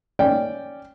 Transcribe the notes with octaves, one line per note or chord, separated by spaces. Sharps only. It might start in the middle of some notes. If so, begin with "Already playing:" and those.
C#4 D5 G5